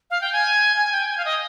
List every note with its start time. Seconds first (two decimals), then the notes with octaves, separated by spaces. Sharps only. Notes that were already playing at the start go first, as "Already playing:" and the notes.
0.10 F5
0.21 G5
0.32 G#5
0.76 G#5
0.92 G5
1.09 G#5
1.17 F5
1.25 D#5